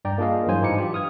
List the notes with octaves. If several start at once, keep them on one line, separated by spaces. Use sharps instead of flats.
G2 D5 G5 A#5
A#3 D4 F4 G#4 D#5 F5
G2 E3 F#3 C5 G#5
G#2 E3 D#4 E4 D6 C#7
D4 F4 G4
D#6 F6 G#6